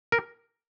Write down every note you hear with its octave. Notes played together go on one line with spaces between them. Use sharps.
A#4